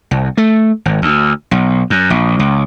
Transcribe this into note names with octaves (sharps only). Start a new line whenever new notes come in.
C2
A3
G#1
D2
B1
F#2
A#1
C#2